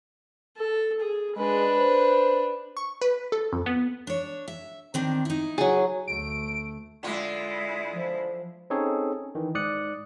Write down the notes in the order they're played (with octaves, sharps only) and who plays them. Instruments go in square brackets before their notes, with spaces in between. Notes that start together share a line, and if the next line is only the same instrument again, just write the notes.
[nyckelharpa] A4
G#4
[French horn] G#3 [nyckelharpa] D4 B4
[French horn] C5
[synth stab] C#6
B4
A4
F2
B3
[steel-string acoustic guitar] D4 C#5
E5
D#3 C4 D4
D#4 E4
[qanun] F#3 G#4
[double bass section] D2 [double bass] A3 [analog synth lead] D7
[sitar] D3 F4 [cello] G#3 E4
[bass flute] F3
[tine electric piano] C4 C#4 D#4 G#4 A4 C#5
D#3 E3
G#2 D5 D#6 F#6 C#7